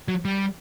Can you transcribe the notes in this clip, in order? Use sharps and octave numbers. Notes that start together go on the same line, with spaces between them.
F#3
G3